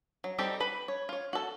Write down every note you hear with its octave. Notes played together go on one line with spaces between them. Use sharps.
F#3
G3 C4 D#4 G4 A4
B4 B5
C#5
F4 C#5
F#4 A4